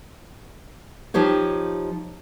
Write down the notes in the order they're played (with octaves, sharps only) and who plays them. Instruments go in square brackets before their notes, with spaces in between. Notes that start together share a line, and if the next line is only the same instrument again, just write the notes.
[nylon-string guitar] F3 D#4 G4 C5 C#5